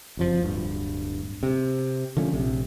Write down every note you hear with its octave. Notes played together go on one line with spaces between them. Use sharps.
F#1 F2 F3
D1 G2
C3
D3 F3 A3 C#4
A#1 C3